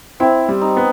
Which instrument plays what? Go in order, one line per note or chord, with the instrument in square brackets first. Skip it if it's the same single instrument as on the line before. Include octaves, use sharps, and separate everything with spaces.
[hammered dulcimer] C4 [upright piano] E4
[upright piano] G3
[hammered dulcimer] D#4
[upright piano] B3